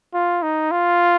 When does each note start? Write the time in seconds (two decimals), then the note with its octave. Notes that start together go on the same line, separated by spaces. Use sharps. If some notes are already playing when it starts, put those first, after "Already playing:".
0.14 F4
0.43 D#4
0.71 F4